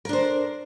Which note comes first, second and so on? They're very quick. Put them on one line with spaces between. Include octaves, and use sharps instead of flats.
A#4 D4 C5